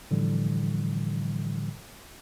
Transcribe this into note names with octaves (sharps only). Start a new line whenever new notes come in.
A2 D3 E3 F3 G3